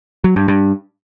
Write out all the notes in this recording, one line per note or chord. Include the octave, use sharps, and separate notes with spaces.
F#3
G2
G2